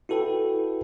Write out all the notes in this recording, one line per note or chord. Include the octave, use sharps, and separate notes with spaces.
E4 F#4 A4 B4 G5